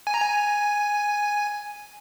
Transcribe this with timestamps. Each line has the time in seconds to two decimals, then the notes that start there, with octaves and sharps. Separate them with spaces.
0.07 G#5
0.14 A#5
0.21 G#5